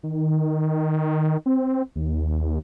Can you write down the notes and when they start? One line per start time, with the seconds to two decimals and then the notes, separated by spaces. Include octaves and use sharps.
0.03 D#3
1.46 C4
1.96 D#2